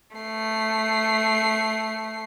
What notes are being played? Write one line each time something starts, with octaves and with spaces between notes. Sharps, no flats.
A3 C7